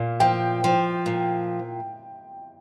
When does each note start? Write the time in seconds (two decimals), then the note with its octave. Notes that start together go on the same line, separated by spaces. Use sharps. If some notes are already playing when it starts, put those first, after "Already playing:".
Already playing: A#2 A#3
0.20 F3 G5
0.64 F3
1.06 A#2